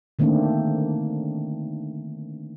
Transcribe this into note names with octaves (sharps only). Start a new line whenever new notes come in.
D3 D#3 A3 A#3 C4 D4